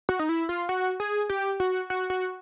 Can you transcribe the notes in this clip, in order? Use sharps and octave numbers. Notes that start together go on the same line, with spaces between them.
F#4
D#4
E4
F4
F#4
G#4
G4
F#4
F#4
F#4